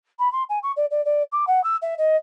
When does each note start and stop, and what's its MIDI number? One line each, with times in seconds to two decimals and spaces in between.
0.18 0.30 83
0.32 0.42 84
0.49 0.59 80
0.62 0.71 85
0.76 0.85 74
0.90 1.03 74
1.05 1.22 74
1.32 1.44 86
1.47 1.62 78
1.63 1.76 88
1.81 1.94 76
1.97 2.16 75